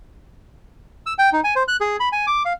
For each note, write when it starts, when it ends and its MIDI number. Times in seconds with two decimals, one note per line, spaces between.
1.06 1.14 88
1.18 1.30 79
1.33 1.40 63
1.44 1.54 80
1.56 1.63 72
1.68 1.77 90
1.81 1.97 68
2.00 2.09 83
2.12 2.26 80
2.27 2.43 86
2.45 2.53 77